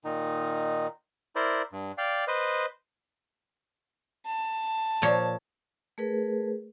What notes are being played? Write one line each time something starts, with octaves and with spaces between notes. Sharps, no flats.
A#2 D#3 D#4
E4 A#4 C5 D5
G2
D5 F5 G5
B4 C5 D#5
A5
A#2 F3 C#5
A3 G#4 A#4 B4